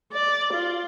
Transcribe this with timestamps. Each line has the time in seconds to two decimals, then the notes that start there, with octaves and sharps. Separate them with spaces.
0.12 D5
0.53 F4